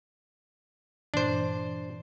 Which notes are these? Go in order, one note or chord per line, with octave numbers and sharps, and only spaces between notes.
G2 A#2 E3 D4 C5